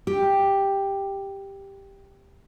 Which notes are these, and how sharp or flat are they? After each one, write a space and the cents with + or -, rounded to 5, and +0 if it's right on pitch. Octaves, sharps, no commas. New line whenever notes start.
G4 +5